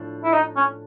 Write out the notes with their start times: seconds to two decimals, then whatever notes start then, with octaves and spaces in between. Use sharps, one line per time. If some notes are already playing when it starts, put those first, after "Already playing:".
Already playing: A2 F3 D4
0.24 E4
0.33 D#4
0.56 C#4